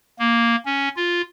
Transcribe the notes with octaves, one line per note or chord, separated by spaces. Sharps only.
A#3
C#4
F4